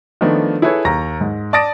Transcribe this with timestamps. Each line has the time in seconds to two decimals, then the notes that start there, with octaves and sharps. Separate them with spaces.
0.21 D#3 F3 A3 B3 D4
0.62 E4 G#4 A4 B4 C#5
0.85 D#2 A#5 A#6
1.21 G#2
1.53 D5 A5 D#6 A6 A#6 D7